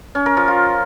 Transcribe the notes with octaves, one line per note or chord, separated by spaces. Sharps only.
C#4
A#4
F3
F4